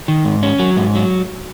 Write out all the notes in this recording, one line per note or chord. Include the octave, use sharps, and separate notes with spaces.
D#3
G#2
C#4
F#3
G#2
F#3